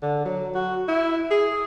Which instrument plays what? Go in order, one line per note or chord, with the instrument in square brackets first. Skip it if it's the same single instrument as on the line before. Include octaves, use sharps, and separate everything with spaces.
[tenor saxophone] D3
F#3
F#4
E4
G#4